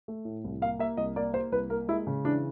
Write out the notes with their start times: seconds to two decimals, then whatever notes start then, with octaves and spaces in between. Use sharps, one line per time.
0.08 A3
0.25 A2
0.44 C2
0.62 A#3 F5
0.79 A#3 E5
0.97 C2 D#5
1.16 A#3 D5
1.33 A#3 C5
1.52 C2 B4
1.70 A#3 A#4
1.88 G#3 E4
2.07 C#3
2.25 E3 D4